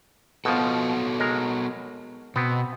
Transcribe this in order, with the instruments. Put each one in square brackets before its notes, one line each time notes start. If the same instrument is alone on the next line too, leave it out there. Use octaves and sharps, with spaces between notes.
[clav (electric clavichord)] B2 F3 [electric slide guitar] B3 F#4 A4
[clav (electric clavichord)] G#3 A#4
[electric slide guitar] B2 [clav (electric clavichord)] B3 C4